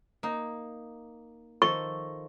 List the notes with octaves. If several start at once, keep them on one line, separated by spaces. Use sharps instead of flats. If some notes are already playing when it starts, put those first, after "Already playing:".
A#3 D#4
D#3 F3 A4 C#6